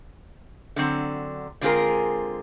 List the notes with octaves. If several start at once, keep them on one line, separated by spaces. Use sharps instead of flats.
D3 F#3 C4
D3 G#3 C4 F4 G#4 A#4